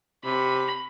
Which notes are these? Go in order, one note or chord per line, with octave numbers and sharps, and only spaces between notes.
C3 B5